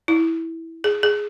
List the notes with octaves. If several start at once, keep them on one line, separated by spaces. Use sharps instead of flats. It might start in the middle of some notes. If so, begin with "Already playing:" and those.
E4
G#4
G#4